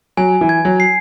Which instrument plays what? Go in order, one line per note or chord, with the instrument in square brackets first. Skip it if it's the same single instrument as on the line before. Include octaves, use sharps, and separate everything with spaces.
[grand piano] F#3 [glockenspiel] G#5
[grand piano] E3
[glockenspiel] G#6
[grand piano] F#3
[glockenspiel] C7